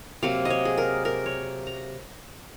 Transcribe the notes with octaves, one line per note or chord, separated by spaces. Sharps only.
C3 F#3 A#3 F5
D#5
C#5
G#4
A#4
A#4
C#5
A#5